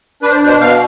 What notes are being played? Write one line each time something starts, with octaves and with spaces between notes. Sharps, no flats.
D4 B4
C5
D5
B2
C5
B2 F5